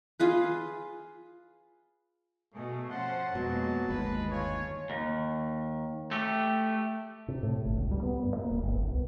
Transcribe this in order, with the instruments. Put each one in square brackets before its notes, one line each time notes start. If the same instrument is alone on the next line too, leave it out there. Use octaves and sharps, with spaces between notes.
[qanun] F4 G#4 B4
[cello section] B2 [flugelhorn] A3 [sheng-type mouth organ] G#4
[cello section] F3 C#4 C5 [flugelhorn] F#5 [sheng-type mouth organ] A5
[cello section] F2 G#3 A#3 [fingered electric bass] B2 [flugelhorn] F#3
[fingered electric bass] G1 D#2 [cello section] G#3 [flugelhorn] B4
[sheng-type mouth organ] F4 G#5 [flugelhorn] C#5
[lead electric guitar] D#2
A3 G4
[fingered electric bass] C3
A2
G1
C#2
G3
B3
G2
A#3
D1
G1
C2
B3